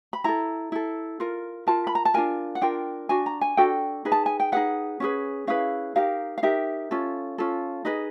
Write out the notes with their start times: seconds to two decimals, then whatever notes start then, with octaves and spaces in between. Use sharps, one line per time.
0.13 B5
0.24 E4 A4 A#5
0.72 E4 A4
1.20 F4 A#4
1.67 F4 A#4 A5
1.87 B5
1.95 A#5
2.05 A5
2.14 D4 F4 A#4 G#5
2.55 F#5
2.61 D4 F4 A#4 G5
3.09 D4 F#4 G#5
3.26 A#5
3.41 G#5
3.57 D4 F#4 A4 G5
4.05 D#4 G#4 B4
4.12 A5
4.26 G#5
4.40 G5
4.52 D#4 G#4 B4 F#5
5.00 C#4 E4 G#4 B4
5.47 C#4 E4 G#4 B4 F5
5.96 D#4 G4 A#4 F5
6.38 F5
6.43 D#4 G4 A#4 E5
6.91 C#4 F4 A4
7.38 C#4 F4 A4
7.85 D#4 G#4 B4 D#5